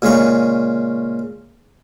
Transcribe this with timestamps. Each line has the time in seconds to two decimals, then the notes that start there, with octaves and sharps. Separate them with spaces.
0.02 A#2 C#3 G#3 C#6